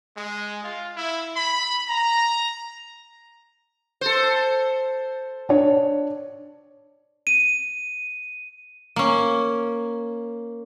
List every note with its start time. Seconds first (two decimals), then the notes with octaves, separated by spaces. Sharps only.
0.17 G#3
0.63 F4
0.97 E4
1.36 B5
1.88 A#5
4.01 A4 C5
5.49 D4 C#5
7.27 D#7
8.96 A#3 C#4